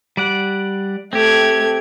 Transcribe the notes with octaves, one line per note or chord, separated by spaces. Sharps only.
G3 D5 F#5
A3 C4 G4 G#6